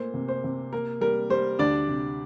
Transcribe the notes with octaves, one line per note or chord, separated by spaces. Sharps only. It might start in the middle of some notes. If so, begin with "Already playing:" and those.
Already playing: A#2 A3 A#3 C5
C3
C5
C3
A#3 A#4
G3 A#4
G3 C5
D2 D4 D5
C3